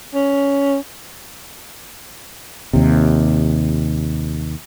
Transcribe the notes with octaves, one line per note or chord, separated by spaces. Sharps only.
C#4
D#2 C3